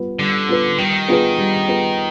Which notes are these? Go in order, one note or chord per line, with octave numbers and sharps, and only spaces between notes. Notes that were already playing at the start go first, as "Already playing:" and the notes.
Already playing: G3 B3 F4 B4
D3 G3
B3 F4 B4
D#3 G3
B3 F4 G#4 B4
G3
B3 F4 G#4 B4